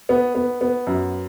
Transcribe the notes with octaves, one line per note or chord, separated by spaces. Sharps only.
B3
B3
B3
F#2